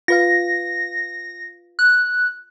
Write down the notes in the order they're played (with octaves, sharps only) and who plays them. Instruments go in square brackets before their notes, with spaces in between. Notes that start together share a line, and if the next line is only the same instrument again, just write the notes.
[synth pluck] F4 B4 F5 [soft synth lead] A#6
[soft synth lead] F#6